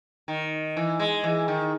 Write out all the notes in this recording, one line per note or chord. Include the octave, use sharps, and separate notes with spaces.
D#3
E3
G#3
E3
D#3